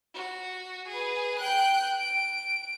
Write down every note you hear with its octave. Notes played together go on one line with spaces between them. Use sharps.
F#4
G#4 B4
G5 F#6
D7